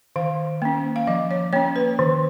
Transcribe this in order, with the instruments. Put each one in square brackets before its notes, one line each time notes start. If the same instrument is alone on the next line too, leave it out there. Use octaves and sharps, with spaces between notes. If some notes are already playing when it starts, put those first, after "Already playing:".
[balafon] D#3 F5
A#3 C#4
F5
F3 D#5
C#5
A#3 C#4 C#5
B4
D#3